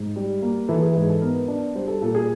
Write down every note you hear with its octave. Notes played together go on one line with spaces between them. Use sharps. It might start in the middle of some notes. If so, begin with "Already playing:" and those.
Already playing: G#2
G3
A#3
E3 A4
G#4
G#2 G#4
A4
B3 A#4
D4
G3 C5
A4
A#2 A4
G#4